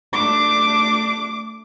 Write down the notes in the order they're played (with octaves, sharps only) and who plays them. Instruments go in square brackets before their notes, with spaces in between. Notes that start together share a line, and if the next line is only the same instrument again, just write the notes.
[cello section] A3 D4 [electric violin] D6